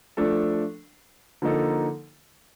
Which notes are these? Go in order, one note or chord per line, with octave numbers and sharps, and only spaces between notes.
F3 A3 D4 A4
D3 F3 A#3 D#4 A4